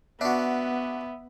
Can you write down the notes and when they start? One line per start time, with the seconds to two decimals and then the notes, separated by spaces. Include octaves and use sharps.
0.21 B3 D4 F#4 E5